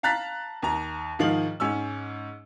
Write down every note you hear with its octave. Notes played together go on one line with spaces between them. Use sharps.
F5 A5 A#5 F#6 A6 B6
D#2 A#5
G#2 D#3 F3 F5 F#7
G#2 C#4 E6